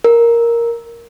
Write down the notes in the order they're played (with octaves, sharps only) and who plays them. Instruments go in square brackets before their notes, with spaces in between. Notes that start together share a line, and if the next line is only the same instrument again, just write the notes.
[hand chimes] A#4